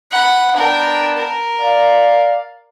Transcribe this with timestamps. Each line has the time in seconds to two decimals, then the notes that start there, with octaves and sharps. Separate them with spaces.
0.12 F#5 B5
0.56 B3 D4 A#4 G5 A5
1.17 A#4
1.61 D5 F5